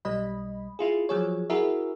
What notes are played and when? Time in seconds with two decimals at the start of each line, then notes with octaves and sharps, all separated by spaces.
0.05 B1 G3 D#5 B5
0.79 E4 F4 G#4
1.09 F3 F#3 G#4 C#5
1.50 E4 F#4 G#4 A#4 E5